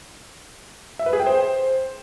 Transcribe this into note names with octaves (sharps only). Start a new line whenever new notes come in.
E5
B4
G#4
G5
C5